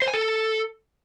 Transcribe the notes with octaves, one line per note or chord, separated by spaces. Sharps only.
C5
G#5
A4